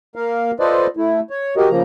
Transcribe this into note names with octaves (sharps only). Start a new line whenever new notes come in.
A#3 A#4 F5
F4 A4 B4 C5 D5 D#5
A3 E4
C#5
F#4 G4 A#4 D#5
C#3 F3 A#3 A#5